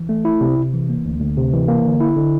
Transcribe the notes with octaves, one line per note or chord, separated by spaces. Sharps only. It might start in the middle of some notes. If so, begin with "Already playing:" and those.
Already playing: E3
A3
E4
C3
C3
E3
A#3
D2
D2
C3
E3
A#3
D3
E4
D3